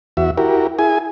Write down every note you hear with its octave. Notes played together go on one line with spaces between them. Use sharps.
E2 F#4 E5
E4 F#4 G4 A#4
E4 G#4 G#5